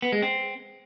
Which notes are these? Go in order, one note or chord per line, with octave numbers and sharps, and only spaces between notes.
B3
G#3
C4